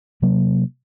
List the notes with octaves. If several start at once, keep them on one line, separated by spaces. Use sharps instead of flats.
C3 F#3 A#3